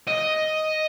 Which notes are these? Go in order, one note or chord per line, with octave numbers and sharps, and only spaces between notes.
D#5